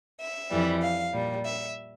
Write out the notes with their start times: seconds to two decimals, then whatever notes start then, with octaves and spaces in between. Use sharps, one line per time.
0.21 E5
0.52 F2 E3 G3
0.83 F5
1.13 A#2 G3
1.45 E5